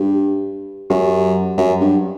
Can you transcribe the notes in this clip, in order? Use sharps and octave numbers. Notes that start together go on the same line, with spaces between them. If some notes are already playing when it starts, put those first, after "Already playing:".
Already playing: G2 G4
F#2 G4
F#2
G2